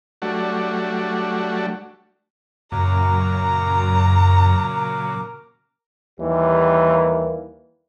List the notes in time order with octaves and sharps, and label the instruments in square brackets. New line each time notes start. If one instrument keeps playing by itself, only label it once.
[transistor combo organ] F#3 G3 A3 D4 F#4
[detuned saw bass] F#2 [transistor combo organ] A#2 C#3 F#3 [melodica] A#4 D6 [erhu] A#5
[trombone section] D#2 E3 G3 A#3